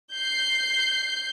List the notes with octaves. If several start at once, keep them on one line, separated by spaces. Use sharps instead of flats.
G6 C7